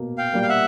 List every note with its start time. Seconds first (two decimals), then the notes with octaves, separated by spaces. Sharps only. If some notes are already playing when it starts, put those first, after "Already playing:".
Already playing: B2 A#3
0.18 F5 G5
0.33 G3 A#3
0.42 F5
0.49 E5 F#5